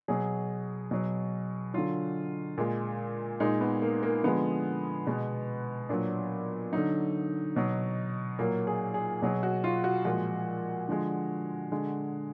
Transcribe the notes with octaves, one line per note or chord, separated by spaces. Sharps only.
B2 F#3 G#4
B2 F#3
D3 F#3 F4
A#2 G#3
A#2 G#3 D#4
B3
A#3
A#3
D3 F3 G#3 B3
B2 G#3
A#2 F#3 D4
D3 F#3 D#4
B2 F#3
A#2 F#3 A#3
G#4
G#4
B2 F#3 G#4
F#4
F4
F#4
A#2 F3 G#3 F#4
D3 F3 G#3
D3 G#3